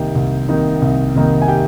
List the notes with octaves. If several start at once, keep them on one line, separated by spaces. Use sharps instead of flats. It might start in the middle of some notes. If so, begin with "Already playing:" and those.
Already playing: C2 C3 D#3 A#3 D#4 G4 G5
C2
C3 D#3 A#3 D#4
C2
C3 D#3 A#3 D#4
G#5
G4 G5